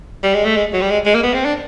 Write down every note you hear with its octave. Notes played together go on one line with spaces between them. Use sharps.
G3
G#3
A3
G#3
F#3
G3
G#3
G#3
A#3
B3
C4
D4